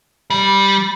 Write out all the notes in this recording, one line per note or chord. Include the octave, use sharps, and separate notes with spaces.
G3